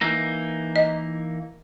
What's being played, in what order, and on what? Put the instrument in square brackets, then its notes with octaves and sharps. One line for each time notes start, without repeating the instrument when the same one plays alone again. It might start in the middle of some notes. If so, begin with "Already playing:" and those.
[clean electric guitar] E3 A#3 D#4
[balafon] D#5